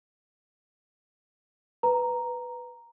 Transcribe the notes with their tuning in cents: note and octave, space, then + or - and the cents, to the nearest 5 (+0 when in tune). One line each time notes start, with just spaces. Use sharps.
B4 +5 A#5 +0